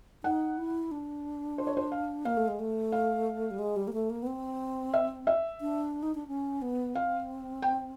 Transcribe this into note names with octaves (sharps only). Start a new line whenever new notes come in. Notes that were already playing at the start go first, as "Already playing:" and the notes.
D#4 F#5
E4
D4
C5
C#5
C5
F5
A#3 F5
A3
G#3
A3
F5
G3
G#3
G3
A#3
A3
A#3
B3
C4
E5
E5
D4
D#4
D4
C#4
B3
C4 F5
G5